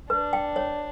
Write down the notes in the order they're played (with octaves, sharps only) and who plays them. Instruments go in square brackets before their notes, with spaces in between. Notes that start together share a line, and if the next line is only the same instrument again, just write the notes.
[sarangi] D4 [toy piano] B4
[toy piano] G5
C#5